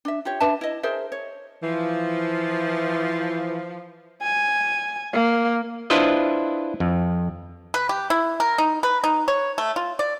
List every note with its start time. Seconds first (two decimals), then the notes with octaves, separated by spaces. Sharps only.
0.05 D4 E5
0.25 F4 G4 C#5
0.40 D4 B4 E5 A5
0.61 E4 D#5
0.83 G#4 A#4 C5 E5
1.12 C#5
1.63 E3 F3
4.22 G#5
5.13 A#3
5.90 D4 E4 F4 B4 C5 D#5
6.80 F2
7.74 B4
7.89 G4
8.10 E4
8.40 A#4
8.58 D#4
8.83 B4
9.04 D#4
9.28 C#5
9.58 A3
9.76 F4
9.99 D5